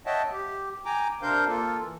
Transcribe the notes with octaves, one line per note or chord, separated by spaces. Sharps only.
C#5 D#5 E5 F#5 G5 A5
G4
G5 G#5 A#5 D6
C3 D4 A#4 C5 F5 G6
A#3 F4 A4
E3